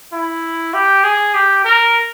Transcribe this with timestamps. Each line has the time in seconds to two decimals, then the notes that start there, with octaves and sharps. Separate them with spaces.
0.13 E4
0.74 G4
1.04 G#4
1.35 G4
1.65 A#4